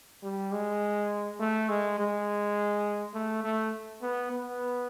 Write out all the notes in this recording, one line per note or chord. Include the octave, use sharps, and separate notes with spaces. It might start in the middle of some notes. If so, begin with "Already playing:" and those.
G3
G#3
A3
G#3
G#3
A3
A3
B3
B3